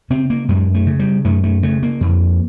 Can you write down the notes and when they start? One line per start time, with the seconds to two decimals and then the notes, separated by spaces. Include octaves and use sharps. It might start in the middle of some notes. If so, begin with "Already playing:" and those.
0.10 C#3 C4
0.30 A#3
0.48 F#2 G#3
0.74 A3
0.86 C#3
0.99 G3
1.25 F#2 A3
1.44 A3
1.63 C#3 A3
1.83 A#3
2.01 F2